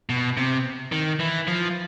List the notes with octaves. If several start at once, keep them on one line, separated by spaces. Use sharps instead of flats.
B2
C3
D#3
E3
F3